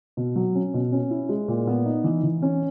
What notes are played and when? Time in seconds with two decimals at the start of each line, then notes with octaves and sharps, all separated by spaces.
0.17 B2
0.36 F#3
0.55 C#4
0.74 B2
0.92 C#4
1.10 E4
1.29 G#3
1.48 A#2
1.67 B3
1.86 D#4
2.04 E3
2.23 E3
2.42 C#4